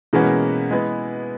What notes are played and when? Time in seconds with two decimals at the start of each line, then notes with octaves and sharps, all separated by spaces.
0.13 B2 E3 G#3 A#3 C#4 F#4 B4
0.71 G#3 B3 E4 B4